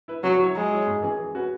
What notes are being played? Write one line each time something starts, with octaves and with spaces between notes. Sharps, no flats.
E4 B4
C#3 F#3
F#3 E4 C#5
F#3 G#3
E4 C#5
G#2
E3 C#4 G#4
E3
C#4 F#4 B4